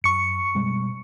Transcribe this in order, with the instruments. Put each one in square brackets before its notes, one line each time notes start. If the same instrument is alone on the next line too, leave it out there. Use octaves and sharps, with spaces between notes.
[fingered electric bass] F#2 [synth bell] C#6 C#7
[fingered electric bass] B2 G3 G#3